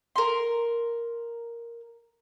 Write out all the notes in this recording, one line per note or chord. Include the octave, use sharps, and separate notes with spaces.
A#4 C6